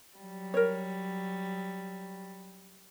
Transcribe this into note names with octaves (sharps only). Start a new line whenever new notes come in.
F#3 G3
A#4 C#5